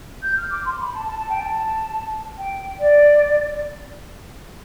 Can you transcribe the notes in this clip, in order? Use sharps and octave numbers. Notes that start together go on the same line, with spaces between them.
G6
F6
D6
C6
B5
A5
A5
A5
G5
A5
G5
D5